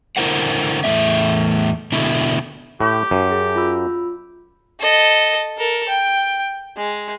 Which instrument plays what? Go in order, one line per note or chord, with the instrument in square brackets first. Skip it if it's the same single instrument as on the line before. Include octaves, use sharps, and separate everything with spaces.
[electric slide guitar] D3 E4 A#4 C5 F#5
E2 A2 E3 A3 B3 E5
B2 D3 E4
[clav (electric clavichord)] A2 [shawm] G4
[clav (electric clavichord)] F#2
[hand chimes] G#4
F4 B5 E6
[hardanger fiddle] A4 D#5
A4 A#4
G5
G#3